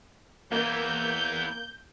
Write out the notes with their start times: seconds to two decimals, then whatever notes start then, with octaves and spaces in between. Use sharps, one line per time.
0.52 E2 E3 A#3 G6